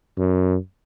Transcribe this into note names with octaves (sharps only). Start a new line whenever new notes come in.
F#2